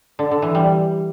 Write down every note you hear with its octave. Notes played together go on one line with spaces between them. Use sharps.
D3
D3
E3
G3